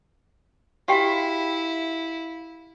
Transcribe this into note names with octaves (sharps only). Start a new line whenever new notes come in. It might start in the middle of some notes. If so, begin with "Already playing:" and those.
E4 F#4 G4 F5 G5 B6